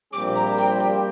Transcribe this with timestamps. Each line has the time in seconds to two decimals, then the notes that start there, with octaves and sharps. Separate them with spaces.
0.13 A#1 A#2 G3 C4 G4 D6
0.35 A#5
0.58 G5
0.80 G5